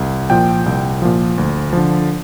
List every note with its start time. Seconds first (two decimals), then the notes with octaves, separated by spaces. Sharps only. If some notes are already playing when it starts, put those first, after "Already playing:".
Already playing: C2
0.30 A#2 F3 G5
0.66 C2
1.02 A#2 F3
1.38 D2
1.73 D3 F3